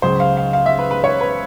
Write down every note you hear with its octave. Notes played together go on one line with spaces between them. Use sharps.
C#2 C#3 F#3 C5
F5
F5
F5
E5
B4
B4
C#5
B4